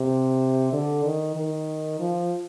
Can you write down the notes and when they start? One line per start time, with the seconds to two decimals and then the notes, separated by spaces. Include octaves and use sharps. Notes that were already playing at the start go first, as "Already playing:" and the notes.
Already playing: C3
0.73 D3
1.04 D#3
1.35 D#3
2.00 F3